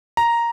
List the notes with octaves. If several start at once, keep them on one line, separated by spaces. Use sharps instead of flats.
A#5